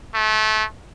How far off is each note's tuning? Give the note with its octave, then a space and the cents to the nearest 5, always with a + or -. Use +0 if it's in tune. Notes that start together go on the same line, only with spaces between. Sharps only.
A3 -25